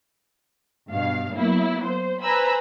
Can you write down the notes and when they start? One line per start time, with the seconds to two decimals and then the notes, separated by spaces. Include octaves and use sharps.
0.89 G2 B2 F5
1.36 F#3 A#3 B3 E4
1.85 C5
2.23 B4 C5 G#5 A#5 B5 E6